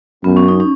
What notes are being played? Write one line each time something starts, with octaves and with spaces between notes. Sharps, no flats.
F#2 B3
C#4
D#4
C#4